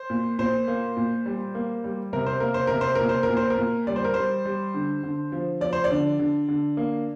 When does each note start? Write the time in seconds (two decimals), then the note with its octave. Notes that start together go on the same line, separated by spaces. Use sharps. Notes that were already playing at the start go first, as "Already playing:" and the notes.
Already playing: C5
0.10 A#2
0.39 A#2 C5
0.68 A#3
0.97 A#2
1.26 G3
1.55 A#3
1.84 G3
2.13 C3 A#4
2.26 C5
2.40 A#3 A#4
2.54 C5
2.67 C3 A#4
2.81 C5
2.95 A#2 A#4
3.09 C5
3.23 A#4
3.29 A#2
3.37 C5
3.50 A#4
3.58 A#2
3.87 G3 D5
3.96 C5
4.04 A#4
4.14 G3 C5
4.45 G3
4.74 D3
5.03 D3
5.32 F3
5.61 F3 D5
5.73 C5
5.84 D5
5.90 D3
6.19 D3
6.49 D3
6.77 A#3